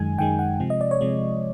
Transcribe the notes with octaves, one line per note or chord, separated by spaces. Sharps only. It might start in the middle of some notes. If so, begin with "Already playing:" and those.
Already playing: F#2 D#3 G#3 G#5
F#2 D#3 G#3 G5
F#5
C3 F3 G#3
D#5
D5
C#5
C3 F3 G#3